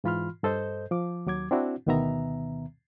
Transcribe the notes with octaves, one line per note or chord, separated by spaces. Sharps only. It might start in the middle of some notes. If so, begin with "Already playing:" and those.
G#2 E3 F4 B5 C6 F6
G2 A4 C5 D#5 G6
F3 D6
D#2 F#3 D6 G#6
C4 D4 E4 F#4
D2 B2 D#3 B3 E5 A#5